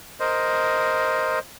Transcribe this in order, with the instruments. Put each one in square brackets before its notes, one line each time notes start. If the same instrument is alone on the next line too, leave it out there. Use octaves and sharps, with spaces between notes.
[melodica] A#4 C5 D#5